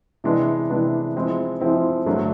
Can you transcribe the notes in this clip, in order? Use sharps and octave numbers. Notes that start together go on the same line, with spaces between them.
C3 E3 G#3 B3 D4
C3 E3 G#3 B3 D4
F3 G#3 C4 E4
F3 G#3 C4 E4
G2 D3 F#3 A3 D4